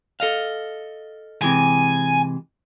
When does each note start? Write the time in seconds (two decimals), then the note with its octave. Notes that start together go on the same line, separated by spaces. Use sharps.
0.20 A4 D#5 F5
1.42 C3 E3 G#3 G#5